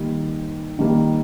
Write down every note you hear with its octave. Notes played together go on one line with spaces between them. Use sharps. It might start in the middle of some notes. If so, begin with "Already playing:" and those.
Already playing: D#3 G3 A#3
D#3 G3 A#3